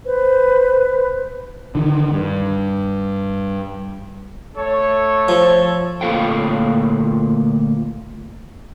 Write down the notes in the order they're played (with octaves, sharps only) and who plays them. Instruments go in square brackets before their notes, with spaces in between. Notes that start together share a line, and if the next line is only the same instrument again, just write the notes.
[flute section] B4 C5
[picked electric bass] D3 D#3
G2
[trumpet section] A3 A4 C#5
[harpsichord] F3
[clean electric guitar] D2 A#2 F4 A4 F5 G5